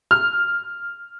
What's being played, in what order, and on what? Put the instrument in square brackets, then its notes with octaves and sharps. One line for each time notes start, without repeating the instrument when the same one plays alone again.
[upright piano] F6